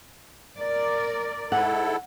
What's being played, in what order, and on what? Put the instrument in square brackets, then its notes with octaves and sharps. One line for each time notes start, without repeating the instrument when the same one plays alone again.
[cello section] A#4 D5
[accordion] G#2 E4 A4 [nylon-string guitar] F#5